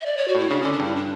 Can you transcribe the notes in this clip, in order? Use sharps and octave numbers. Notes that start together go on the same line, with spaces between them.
E5
D5
C#5
F#4
A2 E4
C#3 D4
D3 C#4
D4
G2 E4
D4